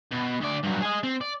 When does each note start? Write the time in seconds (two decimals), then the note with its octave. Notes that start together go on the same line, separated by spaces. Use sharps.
0.12 B2
0.41 D2 D5
0.64 G2 F#3
0.82 G#4 D#5
1.03 C4
1.21 D5